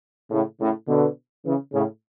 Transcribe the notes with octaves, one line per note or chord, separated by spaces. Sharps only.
A2 C#3
A2 C#3
B2 D3
C#3 E3
A2 C#3